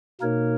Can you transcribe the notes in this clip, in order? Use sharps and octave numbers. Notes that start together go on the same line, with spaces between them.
B2 A#3 D#4 A#4 C#5